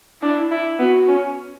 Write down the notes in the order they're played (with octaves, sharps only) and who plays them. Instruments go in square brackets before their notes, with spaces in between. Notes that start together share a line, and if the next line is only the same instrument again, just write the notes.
[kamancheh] D4 [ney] E4
[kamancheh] E4
[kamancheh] B3 [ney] F#4
[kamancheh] C#4